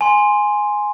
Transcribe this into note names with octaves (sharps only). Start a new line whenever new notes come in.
G#5 C6